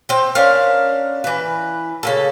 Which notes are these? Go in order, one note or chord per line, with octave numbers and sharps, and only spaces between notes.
C4 G5
C#4 D4 A#4 F5
E3 B4
C#3 A#3 A4